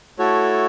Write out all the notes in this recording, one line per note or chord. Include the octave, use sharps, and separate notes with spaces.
A3 E4 F#4 A4 C#5